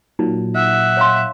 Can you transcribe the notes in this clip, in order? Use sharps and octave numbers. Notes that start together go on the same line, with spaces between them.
A#2 F#3 D#4
E5 F#5
C#5 F5 C6